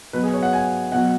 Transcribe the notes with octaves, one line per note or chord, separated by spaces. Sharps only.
B2 F#3 B4
G#4
C#5
F#5
G#5
B2 F#3 F#5